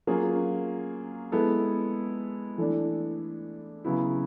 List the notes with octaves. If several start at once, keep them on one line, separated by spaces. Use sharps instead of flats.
F#3 A#3 C#4 F4 G#4
G#3 B3 E4 A4
E3 A3 D4
C#3 F#3 B3 E4